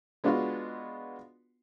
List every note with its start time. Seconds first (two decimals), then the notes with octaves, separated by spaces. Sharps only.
0.24 G#3 B3 D4 F4 F#4